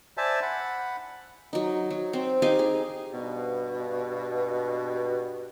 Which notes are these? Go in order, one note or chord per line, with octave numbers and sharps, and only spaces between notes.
C5 D5 E5 G#5 A5
F#5 B5
F#3 D#4
F#3
C4
D#4 G4 F5 G#5
G#4
G2 B2